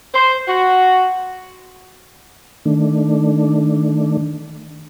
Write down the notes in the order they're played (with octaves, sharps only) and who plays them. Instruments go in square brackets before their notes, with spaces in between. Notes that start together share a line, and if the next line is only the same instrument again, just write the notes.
[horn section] C5
F#4
[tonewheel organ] D#3 A3 D4